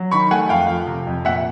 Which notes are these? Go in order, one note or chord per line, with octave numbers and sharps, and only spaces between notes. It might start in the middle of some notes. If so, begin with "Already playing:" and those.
Already playing: F#3
D#3 B5 C#6
A3 F#5 G#5
F2 F5 G5
F3
C3
F2
A#2 E5 F#5